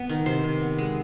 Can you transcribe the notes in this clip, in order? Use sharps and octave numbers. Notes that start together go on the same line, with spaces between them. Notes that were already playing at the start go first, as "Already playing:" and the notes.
Already playing: B3
D#3
C3 C5
C3
B3
G#3